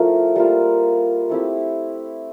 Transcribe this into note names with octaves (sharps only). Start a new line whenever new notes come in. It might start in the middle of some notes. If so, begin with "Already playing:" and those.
Already playing: F3 A3 E4 A#4
G3 A#3 F4
A3 C4 E4 G4